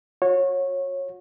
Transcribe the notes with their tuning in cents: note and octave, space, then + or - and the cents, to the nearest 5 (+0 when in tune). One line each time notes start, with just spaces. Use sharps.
F#4 -35 C#5 -20